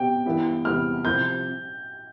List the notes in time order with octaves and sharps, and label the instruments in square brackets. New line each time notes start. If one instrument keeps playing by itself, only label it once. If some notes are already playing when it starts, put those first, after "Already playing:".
Already playing: [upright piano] B2 C4 G4 [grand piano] G5
[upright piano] G2 E3 B3 E4
[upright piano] E2 C3 G3 B3 E4 [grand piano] F6
[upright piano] C2 C3 F3 [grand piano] G6